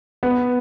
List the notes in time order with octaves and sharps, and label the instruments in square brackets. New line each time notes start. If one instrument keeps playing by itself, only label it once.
[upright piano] B3